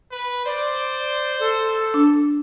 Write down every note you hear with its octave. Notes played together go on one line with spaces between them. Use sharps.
B4
C5 D5
A4
D4